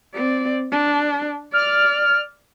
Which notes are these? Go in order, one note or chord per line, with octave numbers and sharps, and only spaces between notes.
C4 D5
D4
D5 F6